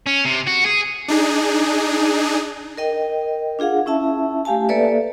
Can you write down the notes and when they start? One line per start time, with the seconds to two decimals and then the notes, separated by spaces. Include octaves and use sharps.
0.06 C#4
0.25 C3
0.47 F#4
0.65 G#4
1.08 D4 D#4 G#4
2.78 A#4 D#5 G5
3.59 D4 F4 G#4 F5 F#5
3.86 C#4 E4 E5 A5
4.45 A3 G4 F5 G#5 A5
4.69 A#3 A4 B4 D5 E5